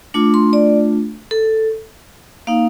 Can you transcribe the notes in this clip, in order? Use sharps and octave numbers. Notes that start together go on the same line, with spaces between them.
A3 D4 F4 D6
C6
D5
A4
A#3 D#4 F5